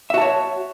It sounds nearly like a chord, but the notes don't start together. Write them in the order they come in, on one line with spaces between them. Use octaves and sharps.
E5 F#4 A5 C#5